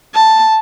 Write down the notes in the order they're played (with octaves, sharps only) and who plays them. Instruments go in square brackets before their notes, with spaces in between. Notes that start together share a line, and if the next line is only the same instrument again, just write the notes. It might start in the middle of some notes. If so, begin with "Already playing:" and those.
[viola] A5